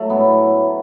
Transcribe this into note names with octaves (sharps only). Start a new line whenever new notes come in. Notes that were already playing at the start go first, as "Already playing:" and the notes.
Already playing: F#3 A3
A2 B3
F#3